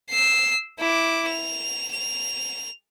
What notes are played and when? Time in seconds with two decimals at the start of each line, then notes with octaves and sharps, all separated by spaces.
0.11 E6 C7
0.80 E4 D6
1.29 F7
1.92 F7